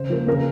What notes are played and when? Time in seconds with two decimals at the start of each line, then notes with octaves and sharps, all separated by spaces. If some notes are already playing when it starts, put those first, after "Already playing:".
Already playing: C#3 C5
0.10 F3 A#3
0.27 C#3 A#4